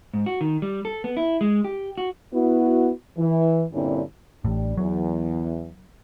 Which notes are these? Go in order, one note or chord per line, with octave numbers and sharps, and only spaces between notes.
G#2
F#4
D#3
G3
A4
B3
E4
G#3
G4
F#4
B3 E4 F#4
E3
G2 A#2 D3 C4 C#4 E4
A1 A2 G3 D4
E2 F#3